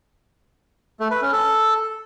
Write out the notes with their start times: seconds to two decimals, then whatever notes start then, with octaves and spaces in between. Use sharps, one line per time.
1.00 A3
1.11 B4
1.22 C#4
1.32 A4